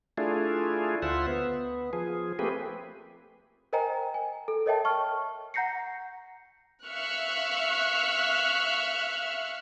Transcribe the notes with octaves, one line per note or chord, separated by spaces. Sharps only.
A3 D4 E4 F4 G#4
D2 F4 C5 E5 F#5
B3
F3 G#4
A3 A#3 C4 G4 G#4 B4
A#4 C5 D#5 G5 G#5 A#5
G#5
A4
A#4 C#5 D#5 E5 G5 A5
A5 C#6 F6
F#5 A#5 G6 A#6 C7 C#7
E5 F5 C#6 F6 F#6